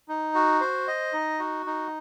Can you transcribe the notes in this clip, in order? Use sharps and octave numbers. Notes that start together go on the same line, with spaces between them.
D#4
F#4
C5
D#5
D#4
F#4
D#4